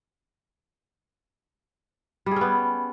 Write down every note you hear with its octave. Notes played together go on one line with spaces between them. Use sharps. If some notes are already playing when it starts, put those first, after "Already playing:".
G3 B3 C#4 G#4